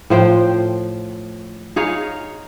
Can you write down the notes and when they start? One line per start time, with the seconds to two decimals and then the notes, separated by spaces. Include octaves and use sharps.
0.10 A2 F3 C5 G5
1.76 D#4 G#4 C#5 F5